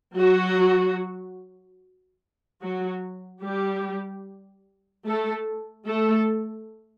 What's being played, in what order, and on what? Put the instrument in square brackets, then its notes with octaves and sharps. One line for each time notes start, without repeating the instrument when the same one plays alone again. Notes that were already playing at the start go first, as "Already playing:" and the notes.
[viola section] F#3 F#4
F#3 F#4
G3 G4
A3 A4
A3 A4